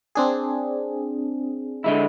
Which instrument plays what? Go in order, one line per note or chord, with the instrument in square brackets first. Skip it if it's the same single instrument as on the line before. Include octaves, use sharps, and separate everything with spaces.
[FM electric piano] C4 D4 G#4
[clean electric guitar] D3 G#3 E4